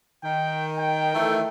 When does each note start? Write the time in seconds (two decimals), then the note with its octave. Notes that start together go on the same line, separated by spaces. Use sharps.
0.23 D#3 G5
0.78 G5
1.13 D#3 E3 A3